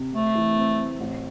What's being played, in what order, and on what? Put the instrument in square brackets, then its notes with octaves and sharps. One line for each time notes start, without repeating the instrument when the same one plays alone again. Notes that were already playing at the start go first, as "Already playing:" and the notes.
Already playing: [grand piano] C3
[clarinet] A3 [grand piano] C4
[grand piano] E3
C4
C4
A1